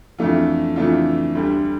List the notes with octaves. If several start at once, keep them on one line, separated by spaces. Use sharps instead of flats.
F2 E3 A3 D4 F4
F2 E3 A3 D4 F4
D2 D3 G3 D4